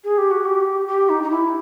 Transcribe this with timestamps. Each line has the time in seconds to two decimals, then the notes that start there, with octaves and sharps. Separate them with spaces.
0.04 G#4
0.18 G4
0.31 F#4
0.45 G4
0.87 G4
1.09 D#4
1.23 D#4
1.31 E4